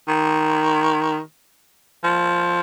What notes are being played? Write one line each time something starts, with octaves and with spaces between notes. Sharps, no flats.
D#3
F3